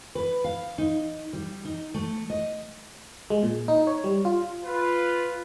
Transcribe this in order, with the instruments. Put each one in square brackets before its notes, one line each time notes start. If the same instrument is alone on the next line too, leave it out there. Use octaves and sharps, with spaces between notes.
[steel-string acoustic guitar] B4
F5
D#4
G3
D#4
A3
D#5
[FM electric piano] G#3
A#2
D#4
C#5
G3
F4
[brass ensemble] F4 [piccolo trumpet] B4